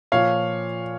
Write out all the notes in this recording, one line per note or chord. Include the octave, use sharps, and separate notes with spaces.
A#2 F3 C#5 F5